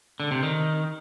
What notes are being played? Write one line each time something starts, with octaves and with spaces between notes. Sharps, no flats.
D3
C3
D#3